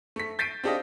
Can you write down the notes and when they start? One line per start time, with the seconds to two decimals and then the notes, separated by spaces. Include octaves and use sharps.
0.16 A3 B6
0.39 G6 A6 B6 C7 D7 D#7
0.64 C4 D4 G4 A4 D#5 F5